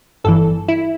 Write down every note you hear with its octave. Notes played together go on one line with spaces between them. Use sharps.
G1 G2 E3 A4
E4